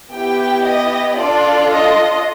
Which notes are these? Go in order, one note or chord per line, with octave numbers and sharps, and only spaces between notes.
B3 E4 G4 G5
D#5
D4 F4 A4 D5
D#5